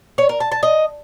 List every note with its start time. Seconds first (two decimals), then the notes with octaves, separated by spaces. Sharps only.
0.18 C#5
0.29 A#4
0.40 A5
0.52 A5
0.63 D#5